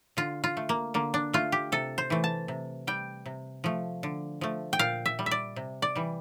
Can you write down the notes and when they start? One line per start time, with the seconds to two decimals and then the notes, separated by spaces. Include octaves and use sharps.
0.17 D3 F4
0.44 F4
0.57 A3
0.69 A#3
0.94 D3 A#3
1.14 D4
1.34 A3 F4
1.52 G4
1.72 C3 A4
1.98 C5
2.10 E3 A3
2.24 A5
2.48 C3
2.87 G3 G5
3.26 C3
3.64 F3 A3
4.03 D3
4.41 F3 A3
4.73 G5
4.79 A#2 F5
5.06 E5
5.19 G3
5.26 E5
5.31 D5
5.56 C3
5.82 D5
5.96 E3 G3